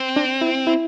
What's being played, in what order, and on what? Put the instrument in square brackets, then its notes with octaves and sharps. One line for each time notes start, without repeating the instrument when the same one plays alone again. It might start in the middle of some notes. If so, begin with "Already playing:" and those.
Already playing: [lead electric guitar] C4
[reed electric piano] D4
E4
E4